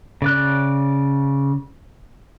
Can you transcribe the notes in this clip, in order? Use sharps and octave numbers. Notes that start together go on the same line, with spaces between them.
C#3 D5 F#6